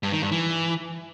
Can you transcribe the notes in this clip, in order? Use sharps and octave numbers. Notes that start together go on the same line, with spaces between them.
G2
D#3
G2
E3